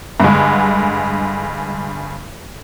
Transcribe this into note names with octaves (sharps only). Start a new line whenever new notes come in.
G2 D3 G#3